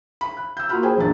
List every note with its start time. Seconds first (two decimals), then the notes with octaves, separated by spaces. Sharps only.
0.21 B5
0.37 F#6
0.57 E6 G6
0.69 A#3 F4 F#4 B5 F6
0.83 G#4 C5 G5 G#5
0.96 A#1 F#2 D4 A6